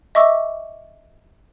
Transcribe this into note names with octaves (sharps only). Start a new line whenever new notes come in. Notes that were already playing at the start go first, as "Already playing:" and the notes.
D#5 E5 C#6 D6 E6